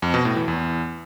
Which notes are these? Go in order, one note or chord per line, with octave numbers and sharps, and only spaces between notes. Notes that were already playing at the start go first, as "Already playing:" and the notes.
F2
B2
A2
E3
E2